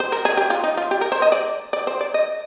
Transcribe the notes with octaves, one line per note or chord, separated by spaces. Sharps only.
C5
A#4
G#4
G4
F4
D#4
F4
G4
A#4
C5
D#5
D5
D5
C5
D5
D#5